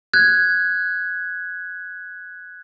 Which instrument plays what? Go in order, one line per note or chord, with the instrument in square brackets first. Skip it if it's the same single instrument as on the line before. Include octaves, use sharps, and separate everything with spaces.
[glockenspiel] F#6 G#6